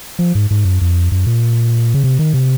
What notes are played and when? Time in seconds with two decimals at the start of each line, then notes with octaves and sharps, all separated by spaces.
0.19 F3
0.35 G#2
0.50 G#2
0.65 F#2
0.81 F2
1.12 F#2
1.27 A#2
1.94 C#3
2.04 C3
2.19 D#3
2.34 C3